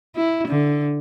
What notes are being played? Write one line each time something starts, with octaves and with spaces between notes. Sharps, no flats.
E4
D3